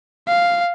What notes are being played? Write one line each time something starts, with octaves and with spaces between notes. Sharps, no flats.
F5